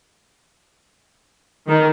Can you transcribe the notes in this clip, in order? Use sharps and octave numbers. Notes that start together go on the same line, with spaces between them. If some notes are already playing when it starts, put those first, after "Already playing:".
D#3